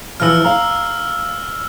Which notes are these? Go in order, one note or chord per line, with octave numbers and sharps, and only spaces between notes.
E3 F3 E6 F6
F5 A#5